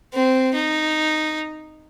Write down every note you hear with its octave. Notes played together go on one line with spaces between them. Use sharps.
C4
D#4